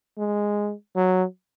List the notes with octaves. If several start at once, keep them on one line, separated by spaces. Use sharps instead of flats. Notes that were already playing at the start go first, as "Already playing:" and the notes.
G#3
F#3